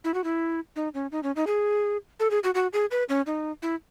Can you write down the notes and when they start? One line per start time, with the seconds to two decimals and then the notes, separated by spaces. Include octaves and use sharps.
0.04 E4
0.14 F#4
0.24 E4
0.76 D#4
0.94 C#4
1.12 D#4
1.23 C#4
1.36 D#4
1.47 G#4
2.20 A4
2.31 G#4
2.44 F#4
2.54 F#4
2.73 G#4
2.91 B4
3.09 C#4
3.26 D#4
3.62 E4